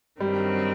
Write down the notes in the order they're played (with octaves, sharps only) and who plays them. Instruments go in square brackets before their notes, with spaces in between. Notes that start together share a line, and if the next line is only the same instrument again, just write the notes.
[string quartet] G2 D#3 F#3 C4 [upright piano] G3